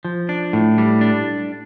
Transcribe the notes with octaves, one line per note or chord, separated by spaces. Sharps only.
F3
D4
A2
G3
D4